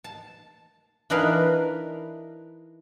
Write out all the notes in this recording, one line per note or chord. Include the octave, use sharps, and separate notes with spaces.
A5
E3 D4 D#4 A#4 B4 F5